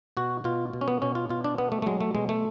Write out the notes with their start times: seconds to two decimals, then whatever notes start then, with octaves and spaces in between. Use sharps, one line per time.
0.17 B2 F#4
0.44 B2 F4
0.73 B2
0.81 C#4
0.88 B3
1.02 B2 C#4
1.15 F4
1.29 B2 F4
1.44 D4
1.58 B2 B3
1.72 A3
1.82 A3
1.86 F#3 G#3
2.01 A3
2.15 B2 G#3
2.29 A3